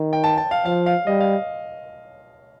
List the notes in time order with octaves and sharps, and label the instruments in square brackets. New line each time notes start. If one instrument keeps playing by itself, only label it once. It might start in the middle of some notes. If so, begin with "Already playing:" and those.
Already playing: [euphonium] D#3
[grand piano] G5
A5
A5
F5
[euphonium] F3 [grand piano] F5
[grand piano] F5
[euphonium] G3 [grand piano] D#5
[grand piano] F5